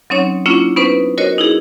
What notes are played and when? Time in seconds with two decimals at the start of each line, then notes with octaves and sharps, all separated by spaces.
0.10 F#3 C4 C#4 D#4 C#5
0.46 A#3 C#4 D4 E4 F4
0.76 B3 C#4 D#4 B4 C5
1.18 F#4 A#4 C5 C#5 D#5
1.38 D#4 E4 G#4